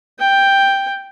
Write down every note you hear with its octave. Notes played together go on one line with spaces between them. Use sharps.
G5